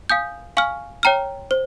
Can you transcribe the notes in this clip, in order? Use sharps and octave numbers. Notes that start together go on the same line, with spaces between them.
F5 G#5 D#6 G6
F5 G#5 C#6 F6
C#5 G5 A#5 F6
C5